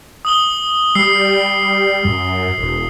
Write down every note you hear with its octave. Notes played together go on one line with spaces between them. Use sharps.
D#6 F#7 G7
G3 D#6 E6 C7
F#2
E1